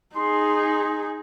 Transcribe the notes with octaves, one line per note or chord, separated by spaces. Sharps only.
D#4 G#4 C6